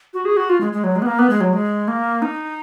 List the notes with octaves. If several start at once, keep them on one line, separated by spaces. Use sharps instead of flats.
F#4
G#4
F#4
F4
G#3
G#3
F#3
G#3
B3
A#3
B3
G#3
F#3
G#3
A#3
D#4